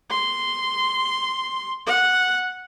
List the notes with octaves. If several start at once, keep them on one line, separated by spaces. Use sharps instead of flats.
C6
F#5